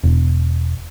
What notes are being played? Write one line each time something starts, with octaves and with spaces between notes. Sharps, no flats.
E1